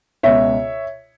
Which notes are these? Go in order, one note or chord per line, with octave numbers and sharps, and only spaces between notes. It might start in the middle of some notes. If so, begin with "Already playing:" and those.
C#2 B2 C#5 E5